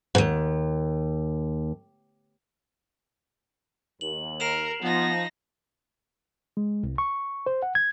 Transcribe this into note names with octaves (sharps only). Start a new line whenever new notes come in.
D#2 G#2
D#2 F#7
A#4 C7 E7 F7
F3 B3 D#4 A#6
G#3
C2
C#6
C5
F#5
G#6